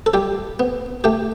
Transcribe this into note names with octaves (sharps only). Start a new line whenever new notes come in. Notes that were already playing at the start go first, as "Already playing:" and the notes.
A4
G3 G4
B3
A3 G4